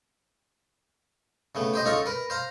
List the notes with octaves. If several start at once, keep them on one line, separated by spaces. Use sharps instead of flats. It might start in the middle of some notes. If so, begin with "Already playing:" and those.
C#3 A3 B3
G4 C5 D#5
C#2 D#4 F4 A4 F5 C#6
A#4 B4
C5 F5 A#5